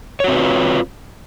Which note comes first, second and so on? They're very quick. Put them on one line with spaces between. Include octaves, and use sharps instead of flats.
C#5 F#4 C4 B4 F4